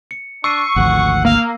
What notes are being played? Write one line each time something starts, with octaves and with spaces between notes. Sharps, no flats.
C#7
D4 C#6 E6 C7 D#7
G#1 D2 F3 F#5
A#3 F5